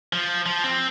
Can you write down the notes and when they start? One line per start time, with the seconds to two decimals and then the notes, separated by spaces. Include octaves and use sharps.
0.13 F3
0.46 F3
0.64 C4